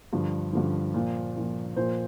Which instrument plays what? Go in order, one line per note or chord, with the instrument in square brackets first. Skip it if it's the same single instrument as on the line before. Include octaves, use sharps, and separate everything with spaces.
[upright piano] G2 D3 F3
G2 D3 F3
A#2 F3
A#2 F3
A#2 F3 C5